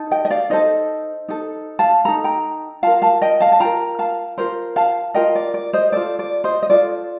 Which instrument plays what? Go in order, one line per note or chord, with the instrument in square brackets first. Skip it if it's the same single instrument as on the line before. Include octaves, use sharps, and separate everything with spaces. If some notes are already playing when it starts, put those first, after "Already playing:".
Already playing: [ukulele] D#4 A4
D#5 G5
D#5
D5 F5
D#4 A4 C5 D#5
D#4 A4
F5 A5
D#4 A4 A#5
G5 A#5
F4 A#4 F5 A5
F5 A5
D#5 G5
F5 A5
A5
F4 A#4 G5 A#5
F5 A5
F4 A#4 C5
F5 A5
F4 A#4 D#5 G5
D5
D5
C5 D#5
F4 A4 D5
D5
C5 D#5
D#5
F4 A4 D5